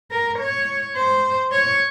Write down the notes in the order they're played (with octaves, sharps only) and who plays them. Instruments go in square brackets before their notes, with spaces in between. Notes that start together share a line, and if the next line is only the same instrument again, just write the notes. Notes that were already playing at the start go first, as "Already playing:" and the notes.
[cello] A#4
C#5
C5
C#5